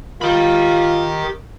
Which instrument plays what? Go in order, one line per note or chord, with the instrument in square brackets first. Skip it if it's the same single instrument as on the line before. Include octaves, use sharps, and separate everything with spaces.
[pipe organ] D#3 [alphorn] F4 [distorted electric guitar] G4 B5